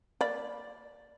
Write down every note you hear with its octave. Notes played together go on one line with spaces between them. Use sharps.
A#3 D5 B5